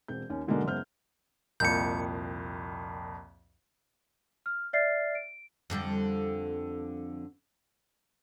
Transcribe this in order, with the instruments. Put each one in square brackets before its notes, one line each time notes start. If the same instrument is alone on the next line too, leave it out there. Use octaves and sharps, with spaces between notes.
[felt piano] E1 C4 G6
D#2 C#4
G#2 B2 D3 F#3 G#3 A#3
F#1 G#3 B3 C5 F6 G6
[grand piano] C2 F2 A#2 [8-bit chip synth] G6 C#7
[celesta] F6
D5 E5 F6 A6 C7
D7
[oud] F2 D3 G3